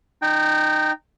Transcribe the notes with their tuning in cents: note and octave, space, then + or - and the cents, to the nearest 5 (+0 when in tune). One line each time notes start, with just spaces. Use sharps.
D#4 -20 G5 +0